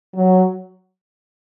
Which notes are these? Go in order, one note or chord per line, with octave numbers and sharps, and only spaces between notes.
F#3